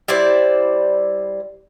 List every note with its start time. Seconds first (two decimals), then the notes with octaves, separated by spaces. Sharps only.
0.08 G3 E4 C5 D5